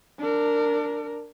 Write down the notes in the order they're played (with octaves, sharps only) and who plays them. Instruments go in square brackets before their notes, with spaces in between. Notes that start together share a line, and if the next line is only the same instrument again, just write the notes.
[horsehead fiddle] D4 A#4